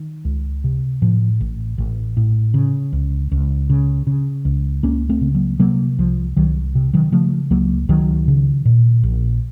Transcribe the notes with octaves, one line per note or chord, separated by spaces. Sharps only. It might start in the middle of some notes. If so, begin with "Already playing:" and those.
Already playing: D#3
C#2
C3
A2 F3
A1
A1
A2
C#3
C#2
C#2
C#3
C#3
C#2
C#2 A#3 C#4
A3 C4
C#3
F#3 A#3
C3 F#3 A#3
C2 F3
C2 D#3 F#3
C3
D#3 F#3
C#3 F3 A3
C#2 F#3 A#3
C#2 D#3 F#3
C#3
A#2
A#1